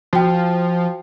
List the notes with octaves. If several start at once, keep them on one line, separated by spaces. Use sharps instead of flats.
F3 F#4 G5